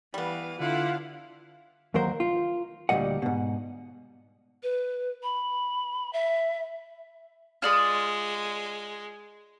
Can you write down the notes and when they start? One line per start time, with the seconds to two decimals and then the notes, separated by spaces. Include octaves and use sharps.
0.14 E3 G3 B3 F5
0.60 D3 E4 F4 F5 F#5
1.94 D#2 D#3 F#3 A#4 C5
2.20 F4
2.89 D2 A#2 C#3 G3 D#5 F#5
3.22 G#2 B2
4.63 B4
5.23 B5
6.13 E5
7.62 G#3 F4 D5 D#6